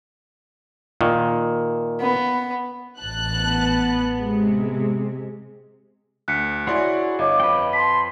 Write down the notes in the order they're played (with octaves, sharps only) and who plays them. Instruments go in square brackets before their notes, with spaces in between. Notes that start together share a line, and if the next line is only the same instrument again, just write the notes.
[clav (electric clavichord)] A#2 D#3
[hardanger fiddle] B3
[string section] A1 A5 F#6
[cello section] B3
[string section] C3 G#3
[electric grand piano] D2 [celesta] F#6 B6 C#7
[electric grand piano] E4 D5 C6 [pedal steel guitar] F#4 G#4 C#5
[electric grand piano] G1 [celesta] C#5 D#5 F5 [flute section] D6
[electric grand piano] F2 [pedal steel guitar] B4 G5
[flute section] A5 C6 [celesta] B6